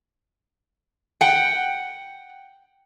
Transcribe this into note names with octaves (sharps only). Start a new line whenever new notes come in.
F#5 G5